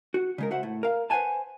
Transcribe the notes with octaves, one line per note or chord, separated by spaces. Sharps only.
F#4
C#3 G#3 A#4
F#4 C5 E5 F#5
A2
A#4 F5
B4 C5 D#5 F#5 G#5 A5